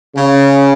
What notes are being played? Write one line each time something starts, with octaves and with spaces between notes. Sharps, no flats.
C#3